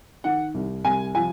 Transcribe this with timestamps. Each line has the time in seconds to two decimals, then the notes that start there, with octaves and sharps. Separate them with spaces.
0.24 D#3 F#5
0.55 C2
0.84 C2 G#5
1.15 F3 G#5